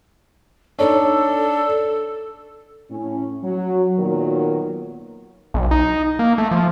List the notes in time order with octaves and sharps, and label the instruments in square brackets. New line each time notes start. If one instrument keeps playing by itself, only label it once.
[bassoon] D4 [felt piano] D#4 C#5 [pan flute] A4
[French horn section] A2 C#4
F#3
A#2 D#3 F#3 B3 A#4
[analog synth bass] B1
D#4
A#3
A3
F3